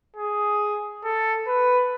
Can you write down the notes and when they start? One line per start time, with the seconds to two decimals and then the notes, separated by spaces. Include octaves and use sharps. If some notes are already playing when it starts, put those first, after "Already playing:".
0.16 G#4
1.04 A4
1.47 B4